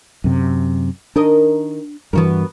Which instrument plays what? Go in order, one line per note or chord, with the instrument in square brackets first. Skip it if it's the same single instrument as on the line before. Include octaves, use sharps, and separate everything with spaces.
[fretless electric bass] F#2 C3
[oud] D#3 A#4 D#5 [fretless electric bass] D4
[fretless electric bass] G2 E3 [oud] B3 F#4 A#4